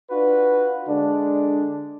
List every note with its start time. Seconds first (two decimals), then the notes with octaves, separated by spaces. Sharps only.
0.10 D4 F4 F#4 B4
0.88 D3 G#3 D4